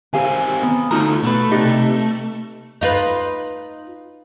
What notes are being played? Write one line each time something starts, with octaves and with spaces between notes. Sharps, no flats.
D#3 C4 G4 F5 G#5
B3
D2 A3 D#4 F4 F#4 A#5
B2 A3 B4
C3 D#4 G4 B4 D5
D#4 F4 B4